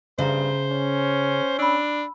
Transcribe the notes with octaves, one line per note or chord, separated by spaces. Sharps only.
G2 C#3 C5 E5 G5 A#5
C#4
D4 B5 E6